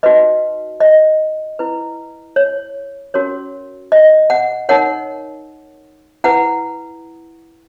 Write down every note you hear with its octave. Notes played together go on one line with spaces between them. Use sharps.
D#4 F#4 B4 D#5
D#5
E4 B4
C#5
C#4 F#4 A#4 C#5
D#5
F#5
D#4 A#4 C#5 F#5
E4 B4 F#5